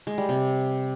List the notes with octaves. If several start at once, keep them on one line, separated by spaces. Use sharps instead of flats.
G#3
G3
C3